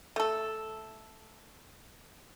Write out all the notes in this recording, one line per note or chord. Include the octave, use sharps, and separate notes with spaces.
A3 A4